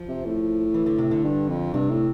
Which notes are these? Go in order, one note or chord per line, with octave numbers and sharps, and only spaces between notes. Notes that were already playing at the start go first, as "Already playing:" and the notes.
Already playing: F3
C3
A2
E3
D3
C3
D3
G2
F2
G2 C3
A2